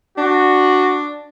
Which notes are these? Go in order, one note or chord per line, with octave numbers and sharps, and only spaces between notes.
D4 F#4